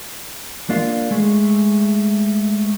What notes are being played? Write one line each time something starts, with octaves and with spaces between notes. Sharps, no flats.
A#3 D4 F4
G#3 A3